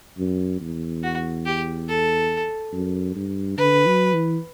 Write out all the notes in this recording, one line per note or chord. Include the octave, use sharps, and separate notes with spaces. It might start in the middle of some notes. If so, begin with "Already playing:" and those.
F#2
E2
F#4
G4
A4
F#2
G2
D3 B4
F#3
E3